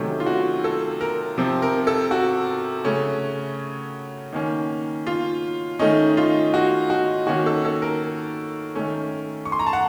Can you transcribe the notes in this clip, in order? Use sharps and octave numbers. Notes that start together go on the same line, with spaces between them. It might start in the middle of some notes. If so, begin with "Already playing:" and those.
Already playing: C3 D#3 F#3 A3 C#4
F4
F#4
A4
A#4
C3 F3 C4
A#4
A4
F#4
C#3 A3 C#4
D#3 A#3 C#4
F4
D#3 A3 C#4 D#4
F4
F#4
F#4
D#3 A#3 C#4 F#4
A4
A4
A#4
D#3 A3 C#4
C#6
C6
A#5
A5
F#5